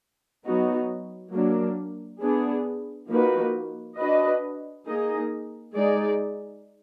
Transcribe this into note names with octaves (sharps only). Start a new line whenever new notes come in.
F#3 B3 D#4 F#4
F#3 A#3 D4
B3 D4 G#4
F3 A#3 D#4 F#4 B4
D4 F#4 B4 D#5
A#3 D#4 G#4 D#5
G#3 D#4 G#4 D5